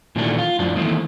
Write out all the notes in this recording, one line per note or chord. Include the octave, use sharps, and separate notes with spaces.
A#2 D#3 E3 F#3 A3 D4
F4
F#2 A2 F3 D4
D#3 E3 A3 A#3 C4